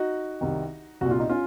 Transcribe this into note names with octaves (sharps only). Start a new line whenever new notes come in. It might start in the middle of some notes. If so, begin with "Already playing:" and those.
Already playing: D#4 F#4
C2 C3 D#3
C2 A#2 F#4
F4
D#4
C#4 F4